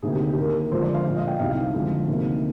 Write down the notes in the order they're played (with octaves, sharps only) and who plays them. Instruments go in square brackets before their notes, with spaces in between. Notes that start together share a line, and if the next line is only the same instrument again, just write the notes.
[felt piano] D2 C3 D#3 A#3 G#4
G4
G4
D#2 D#3 A#3 A#4
F2 D3 F3 G#3 C5
D5
F5
A#2 G#3 F5
D#5
G5
C2 C3 D#3 G3 F5
F2 D3 G#3
D2 C3 D#3 A#3